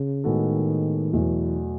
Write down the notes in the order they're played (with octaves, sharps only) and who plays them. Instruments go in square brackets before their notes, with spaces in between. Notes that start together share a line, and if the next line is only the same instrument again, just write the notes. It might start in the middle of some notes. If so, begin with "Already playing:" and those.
Already playing: [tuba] C#3
[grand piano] A2 G#3 B3 F#4 A4 [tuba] D#3
[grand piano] E2 B2 F#3 A3 [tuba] E3